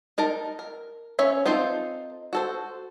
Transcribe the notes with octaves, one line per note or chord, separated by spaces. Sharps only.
D#4 A#4 A5 A#5
A#4
C#4 C#5 E5
C4 D#4 F4 A4 C5
F#4 A4 C5